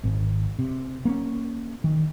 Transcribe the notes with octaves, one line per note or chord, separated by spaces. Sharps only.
G#1
C3
A#3 C4 C#4
D#3